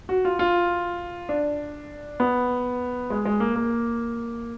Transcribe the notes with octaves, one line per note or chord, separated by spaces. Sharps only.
F#4
F4
F4
D4
B3
G#3
G#3
A#3
A#3